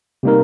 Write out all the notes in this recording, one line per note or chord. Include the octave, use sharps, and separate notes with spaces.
C3 G3 A#3 D#4 A#4